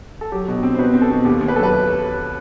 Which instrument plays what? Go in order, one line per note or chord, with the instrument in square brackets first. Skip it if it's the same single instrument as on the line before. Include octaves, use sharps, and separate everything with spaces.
[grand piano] A4
[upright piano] F#3 [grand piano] G4
[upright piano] B2
C4
[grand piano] C5
[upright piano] B2 [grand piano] B4
[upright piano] C4
[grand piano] A4
[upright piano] B2
[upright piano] D#2 [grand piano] G4
[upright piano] D#2
[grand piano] B4
[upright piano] F#3 [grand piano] A4
[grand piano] B4